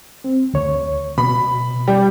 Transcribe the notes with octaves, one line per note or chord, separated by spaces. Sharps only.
C4
D2 C#5
B2 B5
G3 D5 G5